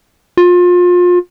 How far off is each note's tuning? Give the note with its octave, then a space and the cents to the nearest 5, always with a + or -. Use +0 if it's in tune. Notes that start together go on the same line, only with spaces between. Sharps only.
F4 +30